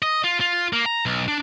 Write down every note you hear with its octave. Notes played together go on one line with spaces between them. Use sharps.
D#5
F4
F4
A#3
A#5
B1
D4